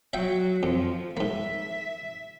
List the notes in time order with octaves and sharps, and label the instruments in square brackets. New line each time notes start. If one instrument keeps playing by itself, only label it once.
[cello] F#3 [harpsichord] E5 F5 G5
[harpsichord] F2 [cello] F3
[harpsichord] G#2 A#3 [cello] E5